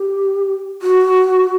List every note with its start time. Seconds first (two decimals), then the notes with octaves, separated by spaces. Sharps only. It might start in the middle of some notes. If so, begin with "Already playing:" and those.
Already playing: G4
0.82 F#4